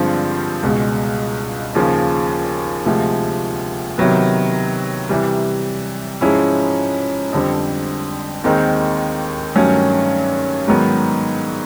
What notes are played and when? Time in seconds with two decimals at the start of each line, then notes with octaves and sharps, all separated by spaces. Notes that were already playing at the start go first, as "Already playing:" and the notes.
Already playing: G2 D3 F3 G#3 C4
0.63 C#2 B2 G#3
1.75 D#2 C#3 F3
2.86 D2 C3 F3 G#3
3.98 C3 D#3 F#3 B3
5.09 C3 E3 G3
6.21 G#2 F3 G#3 C#4 E4
7.32 F2 D3 G3 C4
8.44 D#2 D#3 G#3 C4 D#4
9.56 G2 D#3 F#3 A3 C#4
10.68 G#2 D#3 F#3 B3